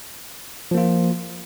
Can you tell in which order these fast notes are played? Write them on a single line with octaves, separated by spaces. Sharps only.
F3 A#3 F4